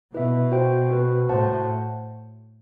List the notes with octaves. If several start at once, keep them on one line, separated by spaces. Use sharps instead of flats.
B2 E4 B4 E5
F#4 C5 G5
B3 F#4 B4
A2 F#4 C5 F#5 A5